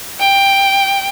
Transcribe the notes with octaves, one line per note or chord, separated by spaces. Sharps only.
G5